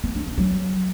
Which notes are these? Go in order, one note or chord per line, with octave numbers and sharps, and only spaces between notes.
B3
D4
D4
F#3